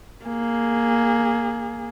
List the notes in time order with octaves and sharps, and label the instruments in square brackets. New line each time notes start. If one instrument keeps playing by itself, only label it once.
[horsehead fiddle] A#3 G#4